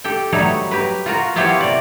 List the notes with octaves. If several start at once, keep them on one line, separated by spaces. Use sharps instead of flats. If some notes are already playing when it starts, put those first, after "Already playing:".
G4 A4 G5
F#3 G3 A3 D#4 B4 C#5
G4 A#4 B4
F4 F#4 A#4
B3 E4 F4 G4 C5 C#5
C3 D5